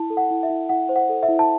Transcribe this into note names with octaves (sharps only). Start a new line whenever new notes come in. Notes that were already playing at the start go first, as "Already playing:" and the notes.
Already playing: E4 A5
A4
F#5
E4
E5
E4
E4 F#5
C5
F#5
A4
E5
E4
A5